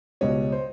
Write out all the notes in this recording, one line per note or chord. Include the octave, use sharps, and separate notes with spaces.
C#2 B2 G3 C#5 D#5
C5